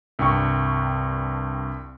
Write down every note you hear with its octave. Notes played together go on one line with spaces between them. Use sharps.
C2 G2 G5 C#6